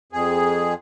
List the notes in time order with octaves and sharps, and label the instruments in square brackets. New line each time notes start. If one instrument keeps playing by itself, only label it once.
[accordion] F2 G#4